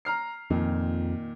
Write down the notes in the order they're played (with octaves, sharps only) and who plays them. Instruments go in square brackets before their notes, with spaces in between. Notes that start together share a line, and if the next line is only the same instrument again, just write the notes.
[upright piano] A#5 F6 C7
[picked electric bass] F2 [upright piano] A#2 D#3